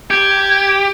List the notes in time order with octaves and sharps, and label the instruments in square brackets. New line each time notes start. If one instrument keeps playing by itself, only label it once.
[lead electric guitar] G4 [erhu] G#6